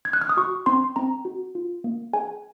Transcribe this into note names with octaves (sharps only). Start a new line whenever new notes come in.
G#6
F#6
F6
D#6
F#4 C#6
C4 C6
C4 A#5
F#4
F4
A#3
G#4 G#5